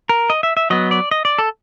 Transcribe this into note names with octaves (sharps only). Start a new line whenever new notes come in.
A#4
D#5
E5
E5
F#3 B3 D#5
D5
D#5
D5
A4